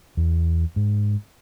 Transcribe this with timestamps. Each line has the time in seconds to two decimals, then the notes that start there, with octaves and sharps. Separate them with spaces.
0.17 E2
0.76 G#2